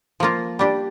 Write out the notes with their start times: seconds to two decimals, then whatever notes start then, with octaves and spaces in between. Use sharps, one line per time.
0.20 F3 A#3 F4
0.59 G3 D4 G4